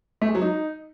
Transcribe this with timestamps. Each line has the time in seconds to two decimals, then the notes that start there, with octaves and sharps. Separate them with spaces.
0.22 A3
0.28 G#3
0.35 F#3
0.41 D#4